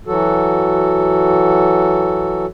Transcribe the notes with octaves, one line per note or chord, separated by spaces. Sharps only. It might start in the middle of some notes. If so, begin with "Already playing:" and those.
E3 F#3 F#4 A4